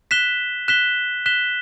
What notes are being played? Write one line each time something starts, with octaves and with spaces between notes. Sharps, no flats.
F#6 B6 E7 G7
F#6 B6 E7 G7
F#6 B6 E7 G7